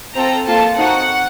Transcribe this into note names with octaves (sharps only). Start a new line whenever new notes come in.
C4 F4 A4 A#5
A#3 F4 A4 A5
C4 D#4 F#4 F#5